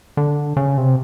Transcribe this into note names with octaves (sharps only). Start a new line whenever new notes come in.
D3
C#3
C3